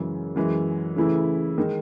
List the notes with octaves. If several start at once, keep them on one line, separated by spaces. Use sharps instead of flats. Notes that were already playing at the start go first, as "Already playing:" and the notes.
Already playing: F#2 C#3 E3 G#3
F#2 E3 G#3
C#3 E3 A3 E4
D#3 G#3 D#4